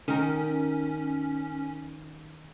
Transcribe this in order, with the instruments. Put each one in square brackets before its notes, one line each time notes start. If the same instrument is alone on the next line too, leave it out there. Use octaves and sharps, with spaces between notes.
[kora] D#3 A#4 [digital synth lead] C#4